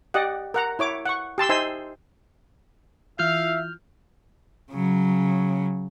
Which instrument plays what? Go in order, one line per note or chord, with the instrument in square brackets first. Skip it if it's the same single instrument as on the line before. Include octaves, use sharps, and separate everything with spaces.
[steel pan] G4 D5 D#5 F#5
A#4 F#5 A#5
E4 C#5 D6
F#5 C#6
G4 A5 C6 E6
D#4 C5 E5 G#5 C6 E6
[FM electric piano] E3 E4 F4 [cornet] E5 [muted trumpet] F5 [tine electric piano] F6 G6
[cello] C#3 F#3